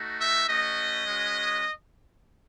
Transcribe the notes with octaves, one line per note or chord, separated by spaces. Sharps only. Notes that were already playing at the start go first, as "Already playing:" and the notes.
Already playing: A3 D#4 F#4
E5
A3 C#4 F#4 D#5
G#3 C#4 F#4